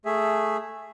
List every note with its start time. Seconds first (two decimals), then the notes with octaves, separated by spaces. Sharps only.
0.05 A3 G#4 E5